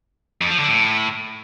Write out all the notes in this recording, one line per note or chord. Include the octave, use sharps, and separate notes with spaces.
F2
F3
D3
A2